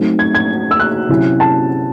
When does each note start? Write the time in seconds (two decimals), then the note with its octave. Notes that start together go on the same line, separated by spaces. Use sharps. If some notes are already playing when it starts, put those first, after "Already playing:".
Already playing: F#3 A3 C4 D#4
0.19 G#6
0.35 G#6
0.71 E6
0.80 F#6
1.09 C3 F#3 C#4 E4
1.40 A5